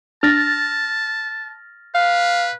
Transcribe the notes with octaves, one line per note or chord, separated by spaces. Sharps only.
D4 A5 F6 A6 A#6
B4 F5